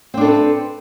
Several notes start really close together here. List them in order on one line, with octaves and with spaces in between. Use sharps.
C4 D4 A4 E4 B4